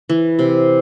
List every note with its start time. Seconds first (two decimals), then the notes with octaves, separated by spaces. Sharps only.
0.09 E3
0.39 C3